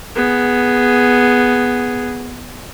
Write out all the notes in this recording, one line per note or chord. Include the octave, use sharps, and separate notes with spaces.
B3 G#4